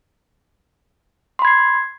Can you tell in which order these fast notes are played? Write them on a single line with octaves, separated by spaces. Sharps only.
C6 B5 G#6 C7